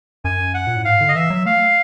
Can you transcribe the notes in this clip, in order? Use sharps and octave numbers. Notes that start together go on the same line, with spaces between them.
F#2 G#5
F#5
A#2
A2
G#2 F5
D3
D#5
E3 E5
F#3
A3 F5